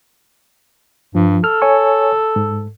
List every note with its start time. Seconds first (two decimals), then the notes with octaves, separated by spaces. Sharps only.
1.15 G2 F3
1.44 A4 F6
1.62 C#5 G#5 C#6
2.36 G#2